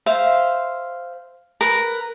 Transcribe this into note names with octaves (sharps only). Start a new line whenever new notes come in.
C5 E5 F5
A#4 B4